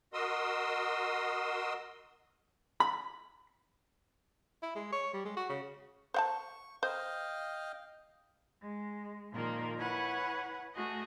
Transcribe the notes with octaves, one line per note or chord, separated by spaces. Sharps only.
F#4 A#4 D#5 C6 D#6 E6
B5
E4
G#3
C#5
G3
G#3
F#4
C#3
C5 F#5 A5 C#6
C5 D#5 F5 G5
G#3
A#2 D#3 F3 A#3 A#4
E4 B4 C#5 F#5 G#5
A3 F#4 G#4 D#5